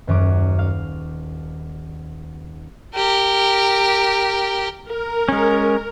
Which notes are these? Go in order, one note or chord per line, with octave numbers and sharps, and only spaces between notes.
D#1 F#2 F#3 D6
F5
G4 A#4
A#4
G#3 C#4